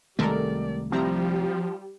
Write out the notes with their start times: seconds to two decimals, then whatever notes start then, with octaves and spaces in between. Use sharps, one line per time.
0.19 C2 D#3 G#3 A3 G4 A4 A#4 D5
0.92 F3 G3 C4 E4 G4 A#5